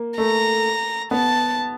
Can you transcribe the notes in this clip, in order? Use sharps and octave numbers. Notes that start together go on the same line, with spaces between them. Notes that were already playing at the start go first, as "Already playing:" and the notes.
Already playing: A#3
A3 A#5
B3 A5